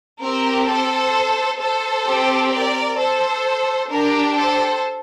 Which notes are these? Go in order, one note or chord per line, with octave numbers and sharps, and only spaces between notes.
C4 G4 A#4
A4 C5
A4 C5
C4 G4
A#4 D5
A4 C5
D4 G4 A#4
A4 C5